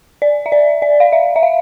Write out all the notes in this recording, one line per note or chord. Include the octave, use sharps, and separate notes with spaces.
D5
E5
D5
D5
F5
E5
E5
F5